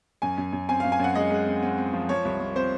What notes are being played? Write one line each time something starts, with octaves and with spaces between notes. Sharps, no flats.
F#2 G#5
F#2
F#2
C4 G#5
F5
F#2
G#5
F#2 F#5
G#3 D#5
G#3
C4
C4
C4
F3
F3 C#5
C2
F3
C4 C5